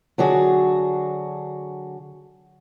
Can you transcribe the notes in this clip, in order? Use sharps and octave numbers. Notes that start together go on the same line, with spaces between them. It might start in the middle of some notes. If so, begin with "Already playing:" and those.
D3 F#3 D4 F#4 G#4